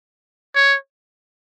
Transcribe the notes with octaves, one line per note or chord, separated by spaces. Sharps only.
C#5